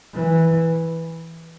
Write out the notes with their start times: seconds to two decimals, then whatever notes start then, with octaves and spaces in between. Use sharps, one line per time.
0.14 E3